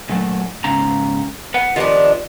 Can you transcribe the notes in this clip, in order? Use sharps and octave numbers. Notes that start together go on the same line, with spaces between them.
A#2 F#3 A3
G#2 C#3 A#5
B4 F#5
D#3 F3 D4 F4 G4 B4